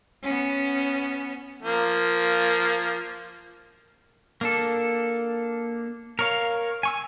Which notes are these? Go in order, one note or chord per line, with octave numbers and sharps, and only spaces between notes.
B3 C#4
F3 A#3
A#3 D4 A4
A#4 C#5 F5
G#5 C#6 E6